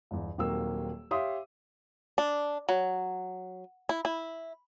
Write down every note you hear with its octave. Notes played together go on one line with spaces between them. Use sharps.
G1 E2
D#1 D#2 F#3 A#3 C4 E6
G4 C#5 E5 F5 C6 D#6
D4
F#3
E4
E4